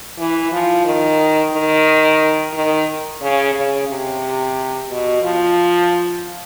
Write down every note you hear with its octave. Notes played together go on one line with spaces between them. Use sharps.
E3
F3
D#3
D#3
D#3
C#3
C#3
C3
B2
F3